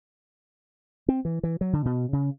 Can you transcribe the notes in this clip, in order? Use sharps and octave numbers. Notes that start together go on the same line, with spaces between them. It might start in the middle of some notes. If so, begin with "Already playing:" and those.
C4
E3
E3
F#3
D3
B2
C#3